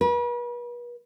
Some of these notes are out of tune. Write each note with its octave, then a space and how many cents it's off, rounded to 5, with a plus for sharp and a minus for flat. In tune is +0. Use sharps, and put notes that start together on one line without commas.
B4 -40